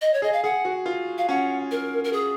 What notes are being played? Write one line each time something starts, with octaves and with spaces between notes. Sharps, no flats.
D#5
C#5
G#4 D#5
F5
G#4 F#5
F#4
F4
F5
C#4 F#5
A#4
A#4
G#4